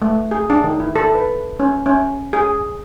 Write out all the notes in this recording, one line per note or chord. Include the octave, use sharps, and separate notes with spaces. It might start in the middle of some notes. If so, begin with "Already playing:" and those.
A3
G#4
D4
D#3
E4
A4
B4
C#4
C#4
G#4